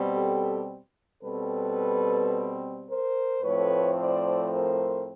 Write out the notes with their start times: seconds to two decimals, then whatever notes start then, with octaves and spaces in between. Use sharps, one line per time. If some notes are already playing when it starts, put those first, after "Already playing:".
Already playing: B2 G3 C4
0.12 G4 A4
1.22 B2 G3 C4 A4 B4
2.87 A#4 C5
3.42 A2 F3 A3 C4 B4 C#5
3.97 C5 D5
4.52 A#4 C5